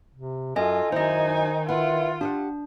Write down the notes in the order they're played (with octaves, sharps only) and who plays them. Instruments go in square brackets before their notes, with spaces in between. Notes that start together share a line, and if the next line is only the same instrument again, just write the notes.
[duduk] C3
[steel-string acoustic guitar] F#2 [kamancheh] F4 [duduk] A4 [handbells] D#5 G#5
[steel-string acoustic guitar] F#2 E4 [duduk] D#3 [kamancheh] D#4 G#5 [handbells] C5 D#5
[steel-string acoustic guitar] E4 B4 [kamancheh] F4 [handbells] F#5
[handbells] D4 [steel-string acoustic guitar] G4 D5 F#5